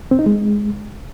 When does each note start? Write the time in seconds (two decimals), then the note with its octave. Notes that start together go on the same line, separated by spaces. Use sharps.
0.11 C4
0.19 D#4
0.26 G#3